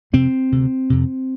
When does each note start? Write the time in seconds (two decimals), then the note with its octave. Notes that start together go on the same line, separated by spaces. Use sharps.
0.13 F2 C3 C4
0.52 D2 C3
0.90 F2 C3